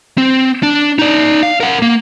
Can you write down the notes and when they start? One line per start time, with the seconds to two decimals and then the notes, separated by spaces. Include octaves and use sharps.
0.18 C4
0.63 D4
0.99 D#4 D5
1.43 F5
1.60 A#4 F#5
1.82 A#3